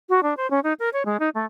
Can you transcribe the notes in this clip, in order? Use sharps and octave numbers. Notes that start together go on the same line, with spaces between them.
F#4
D4
C5
C#4
D#4
A#4
C#5
G#3
D#4
A3